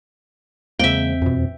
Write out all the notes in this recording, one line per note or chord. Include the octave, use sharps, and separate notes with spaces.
E2 C#3 G#3 A#3 C4 E5 G5
F2 B2